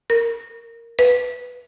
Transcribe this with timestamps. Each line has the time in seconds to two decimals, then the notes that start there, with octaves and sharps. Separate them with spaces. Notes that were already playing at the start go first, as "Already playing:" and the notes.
0.10 A#4
0.99 B4